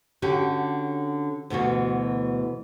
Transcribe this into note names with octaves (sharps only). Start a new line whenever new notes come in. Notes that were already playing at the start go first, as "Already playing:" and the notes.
D3 C#4 F#4 G4
D2 B2 E3 F#4